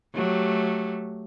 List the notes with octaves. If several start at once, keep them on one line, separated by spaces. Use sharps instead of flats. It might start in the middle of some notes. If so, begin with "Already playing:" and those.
F#3 A3 G4